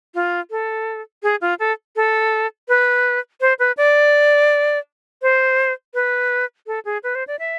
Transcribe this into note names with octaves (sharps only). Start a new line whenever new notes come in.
F4
A4
G#4
F4
A4
A4
B4
C5
B4
D5
C5
B4
A4
G#4
B4
C5
D5
E5